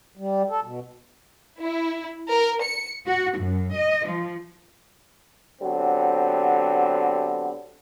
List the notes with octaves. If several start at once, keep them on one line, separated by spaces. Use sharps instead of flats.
G3
A4
B2
E4
A#4
C#7
F#4
F#2
D#5
F3
D3 F#3 B3 C4 G4